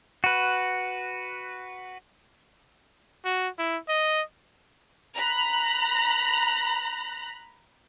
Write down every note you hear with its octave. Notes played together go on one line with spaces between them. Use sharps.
F#4 B4
F#4
E4
D#5
A#5 B5 F#6